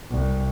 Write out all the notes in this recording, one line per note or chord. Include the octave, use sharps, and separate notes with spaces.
C2